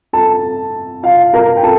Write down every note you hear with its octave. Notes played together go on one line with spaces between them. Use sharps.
A4 A5
F4 F5
A#4 A#5
G5
A4 A5